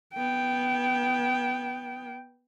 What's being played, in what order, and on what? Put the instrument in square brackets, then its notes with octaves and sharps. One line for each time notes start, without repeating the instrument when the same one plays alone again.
[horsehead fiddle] B3 G5